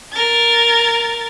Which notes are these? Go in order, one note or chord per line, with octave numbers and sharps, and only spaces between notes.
A#4 A6